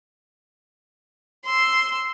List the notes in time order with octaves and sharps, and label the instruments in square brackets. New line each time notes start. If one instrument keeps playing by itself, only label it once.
[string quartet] C6 E6